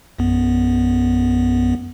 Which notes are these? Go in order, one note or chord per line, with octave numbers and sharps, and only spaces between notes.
A#1 F#2 B3